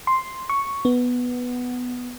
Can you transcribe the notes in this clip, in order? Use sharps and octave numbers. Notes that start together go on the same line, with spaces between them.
C6
C#6
B3